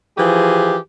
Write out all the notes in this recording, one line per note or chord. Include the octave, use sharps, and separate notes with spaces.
E3 F3 G4 G#4